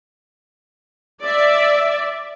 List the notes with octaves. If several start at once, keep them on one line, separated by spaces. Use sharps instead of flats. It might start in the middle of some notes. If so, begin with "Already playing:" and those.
D5 E5